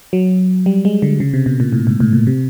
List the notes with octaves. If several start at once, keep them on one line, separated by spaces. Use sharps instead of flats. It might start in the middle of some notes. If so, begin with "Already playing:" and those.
F#3
G3
G#3
D3
C#3
C3
B2
A#2
A2
G#2
A2
A#2
C3